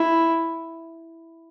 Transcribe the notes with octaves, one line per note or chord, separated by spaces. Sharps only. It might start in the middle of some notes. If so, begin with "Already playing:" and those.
Already playing: E4